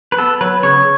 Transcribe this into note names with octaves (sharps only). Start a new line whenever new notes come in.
B4
B3 A4
F#3 B4
C#3 C#5